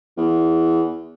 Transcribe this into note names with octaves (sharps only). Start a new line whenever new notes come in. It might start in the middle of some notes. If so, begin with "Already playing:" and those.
E2